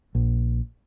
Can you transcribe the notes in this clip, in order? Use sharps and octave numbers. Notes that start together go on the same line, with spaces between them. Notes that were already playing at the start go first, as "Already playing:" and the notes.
A#1